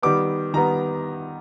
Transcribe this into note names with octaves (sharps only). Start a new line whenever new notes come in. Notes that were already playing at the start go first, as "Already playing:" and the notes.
D#3 G3 B3 D6
D#3 G3 B3 A#5